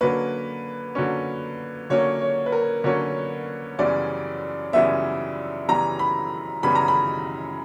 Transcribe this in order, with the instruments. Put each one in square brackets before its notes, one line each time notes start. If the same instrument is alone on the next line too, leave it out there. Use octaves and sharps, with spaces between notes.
[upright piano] D3 F#3 A#3 C#4 [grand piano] B4
[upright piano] D3 F#3 A#3 C#4
[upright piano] D3 F#3 A#3 C#4 [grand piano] C#5
[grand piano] C#5
B4
A#4
[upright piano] D3 F#3 A#3 C#4 [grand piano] C#5
[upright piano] F#2 C#3 E3 G3 B3 [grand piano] D5
[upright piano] F#2 C#3 E3 G3 B3 [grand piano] E5
[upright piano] F#2 C#3 E3 G3 B3 [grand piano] A#5
[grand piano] B5
[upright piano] F#2 C#3 E3 G3 B3 [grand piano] B5
[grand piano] A#5
B5